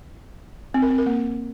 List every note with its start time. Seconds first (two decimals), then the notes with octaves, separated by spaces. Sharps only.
0.74 C4
0.82 A#4
0.90 C4
0.98 A#4
1.06 A#3